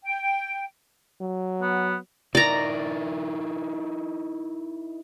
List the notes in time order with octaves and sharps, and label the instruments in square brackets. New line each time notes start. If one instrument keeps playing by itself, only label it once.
[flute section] G5
[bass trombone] F#3
[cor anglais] B3
[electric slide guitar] D#4 E4 A#4 [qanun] D5 A#5